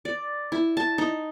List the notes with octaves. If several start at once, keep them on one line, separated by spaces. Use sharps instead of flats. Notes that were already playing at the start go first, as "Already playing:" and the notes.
D5
E4
A5
D#4